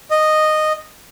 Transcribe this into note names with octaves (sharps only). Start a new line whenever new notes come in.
D#5